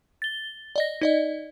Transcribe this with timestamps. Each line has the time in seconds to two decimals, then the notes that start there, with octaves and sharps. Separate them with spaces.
0.22 A6 G7
0.76 D5 D#5 A#6
1.01 D#4 D5 D#5